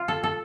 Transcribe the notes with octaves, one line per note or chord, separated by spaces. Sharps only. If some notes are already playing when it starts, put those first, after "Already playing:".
Already playing: F4
A4
A4